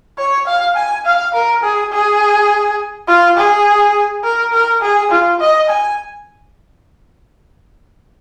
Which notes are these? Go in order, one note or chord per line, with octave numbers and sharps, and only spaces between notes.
C#5
F5
G#5
F5
A#4
G#4
G#4
F4
G#4
A#4
A#4
G#4
F4
D#5
G#5